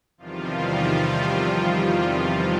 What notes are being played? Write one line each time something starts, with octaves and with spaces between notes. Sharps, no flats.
E2 C3 D#3 F3 G3 F4